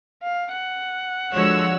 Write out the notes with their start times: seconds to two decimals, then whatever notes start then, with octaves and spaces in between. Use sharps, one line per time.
0.23 F5
0.53 F#5
1.34 D3 F3 G#3 F#4 C#5 E6